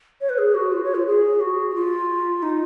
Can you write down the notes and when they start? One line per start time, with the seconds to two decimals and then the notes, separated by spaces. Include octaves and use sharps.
0.21 C#5
0.29 B4
0.38 G#4
0.55 F#4
0.72 F4
0.84 C#5
0.95 F4
1.06 G#4
1.40 F#4
1.70 F#4
1.75 F4
2.43 D#4